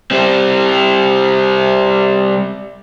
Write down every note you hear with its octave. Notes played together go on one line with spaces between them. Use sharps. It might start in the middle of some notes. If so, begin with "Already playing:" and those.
G3 C4